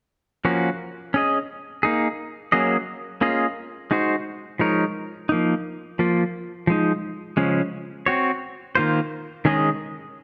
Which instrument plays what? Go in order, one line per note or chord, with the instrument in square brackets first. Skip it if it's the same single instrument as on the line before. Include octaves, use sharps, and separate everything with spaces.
[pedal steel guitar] F3 A#3 C#4 F#4
C#4 G#4 D#5
A#3 D#4 G#4
F#3 A#3 C#4 G#4 D#5
A#3 C#4 F4 G#4 D#5
G#3 D#4 F#4 C5
F3 G#3 D#4 A#4 C#5
F3 A#3 D#4
F3 A#3 F4
F3 G#3 D#4
C#3 F3 G#3 C#4
C4 F#4 C#5
D#3 A#3 F4 C5
D#3 G#3 C#4 G#4 D#5